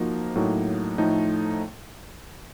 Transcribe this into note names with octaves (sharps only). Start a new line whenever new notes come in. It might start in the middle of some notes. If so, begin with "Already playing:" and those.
Already playing: F3 A#3 D#4 F#4
A2 F#3 A#3 D#4
A2 F3 A3 D#4